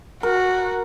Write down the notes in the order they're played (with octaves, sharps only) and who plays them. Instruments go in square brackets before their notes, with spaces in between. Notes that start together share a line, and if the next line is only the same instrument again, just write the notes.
[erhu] F#4 [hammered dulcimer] A#4